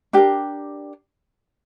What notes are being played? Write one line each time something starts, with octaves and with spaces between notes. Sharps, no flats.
D4 G4 A#4